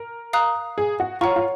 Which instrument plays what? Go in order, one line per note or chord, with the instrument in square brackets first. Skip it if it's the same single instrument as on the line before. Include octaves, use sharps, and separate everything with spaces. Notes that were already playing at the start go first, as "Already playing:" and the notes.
Already playing: [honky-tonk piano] A#4
[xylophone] F5 A#5 D#6 F#6
[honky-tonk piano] G#4
F#4
[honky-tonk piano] F4 [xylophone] C#5 F#5 A#5 C#6
[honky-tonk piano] F4